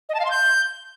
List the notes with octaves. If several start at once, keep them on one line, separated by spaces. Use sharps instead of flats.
D#5
A5
F5
C6
G6